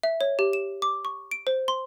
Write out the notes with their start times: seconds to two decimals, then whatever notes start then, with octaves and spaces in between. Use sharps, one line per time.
0.03 E5
0.21 C#5
0.39 G4
0.53 E7
0.82 D6
1.05 C#6
1.31 D7
1.47 C5
1.68 C6